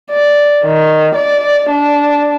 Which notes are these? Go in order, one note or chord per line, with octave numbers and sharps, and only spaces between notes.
D5
D#3
D5
D4